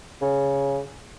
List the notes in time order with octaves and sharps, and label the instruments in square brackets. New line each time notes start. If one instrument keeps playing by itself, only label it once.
[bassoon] C#3